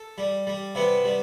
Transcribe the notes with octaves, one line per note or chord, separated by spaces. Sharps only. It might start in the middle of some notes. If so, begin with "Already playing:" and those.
Already playing: A4
G3
G3
C3 B3
G3